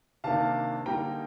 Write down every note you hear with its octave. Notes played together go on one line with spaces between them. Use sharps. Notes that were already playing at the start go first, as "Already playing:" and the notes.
C3 D#3 A#3 D4 F5 A5
D3 G3 A#3 D#4 G5 A#5